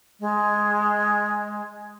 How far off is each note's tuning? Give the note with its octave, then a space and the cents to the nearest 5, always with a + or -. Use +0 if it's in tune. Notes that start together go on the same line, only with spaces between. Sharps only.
G#3 +5